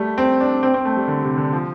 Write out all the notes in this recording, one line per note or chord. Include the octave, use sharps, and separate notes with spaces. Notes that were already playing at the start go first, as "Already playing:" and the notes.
Already playing: G3 A3
C4
D4
C4
C4
A3
G3
D3
C3
D3
F3